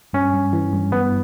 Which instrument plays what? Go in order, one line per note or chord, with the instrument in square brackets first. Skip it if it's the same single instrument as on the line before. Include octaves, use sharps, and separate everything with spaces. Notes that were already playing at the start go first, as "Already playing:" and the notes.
[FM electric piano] G2 [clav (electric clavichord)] C#4
[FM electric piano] G2
E3
G2
[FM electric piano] G2 [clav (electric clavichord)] B3